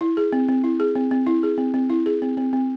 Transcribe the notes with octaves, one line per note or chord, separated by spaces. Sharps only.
E4
G#4
C4
C4
E4
G#4
C4
C4
E4
G#4
C4
C4
E4
G#4
C4
C4
C4